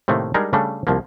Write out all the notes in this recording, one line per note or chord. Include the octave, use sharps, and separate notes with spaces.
A2 C3 D#3 A3 A#3
G3 G#3 D4 D#4 G#4 A#4
C#3 G3 A3 D4 A4
C2 F3 A#3